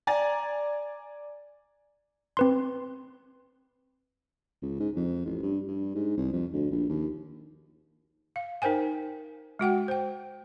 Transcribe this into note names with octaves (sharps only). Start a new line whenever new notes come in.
D5 G#5 A#5 A6
C4 B4 C6
C#2
G#2
F2
A1
G2
G2
G#2
C2
F2
D2
A#1
D#2
F5
D#4 A#4 C5 G5 G#5
G#3 F#4 F#5 G5
C5 G5